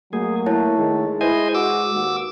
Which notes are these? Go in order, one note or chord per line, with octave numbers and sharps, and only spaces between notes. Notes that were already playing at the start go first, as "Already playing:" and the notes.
F#3 A3 A#3 G#4
A3 E4 C#5 A5
D#3 G#3
E4 B4 C5 D#5 G#5
F#4 D6 E6
D#2 F#4